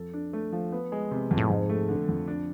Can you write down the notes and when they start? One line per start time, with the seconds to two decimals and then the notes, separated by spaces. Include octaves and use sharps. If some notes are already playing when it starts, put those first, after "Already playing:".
Already playing: F2 A4
0.14 D4
0.33 A3
0.53 F3
0.72 B3
0.92 G#3
1.11 C3
1.31 F2
1.37 A2
1.50 F2 G#2
1.69 A3
1.89 D3
2.09 F2
2.28 D4